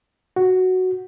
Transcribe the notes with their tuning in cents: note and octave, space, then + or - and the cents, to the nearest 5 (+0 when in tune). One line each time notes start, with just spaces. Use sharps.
F#4 +0